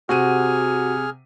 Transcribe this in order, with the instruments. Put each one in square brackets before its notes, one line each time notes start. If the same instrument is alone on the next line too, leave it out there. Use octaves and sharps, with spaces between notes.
[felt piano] C3 F#5 D#7 [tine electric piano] F#4 [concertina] G#4 F6